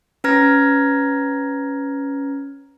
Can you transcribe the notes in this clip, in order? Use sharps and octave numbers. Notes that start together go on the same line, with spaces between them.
C#4 B4 A#5 F6 G#6 A#6